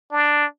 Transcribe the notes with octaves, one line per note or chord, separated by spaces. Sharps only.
D4